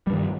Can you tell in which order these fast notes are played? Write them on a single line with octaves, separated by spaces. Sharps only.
G3 G2 D#3